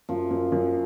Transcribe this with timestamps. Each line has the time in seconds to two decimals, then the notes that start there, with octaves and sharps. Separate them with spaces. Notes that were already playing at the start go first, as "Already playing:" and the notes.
0.09 F#2 F3
0.31 F#2
0.52 F#2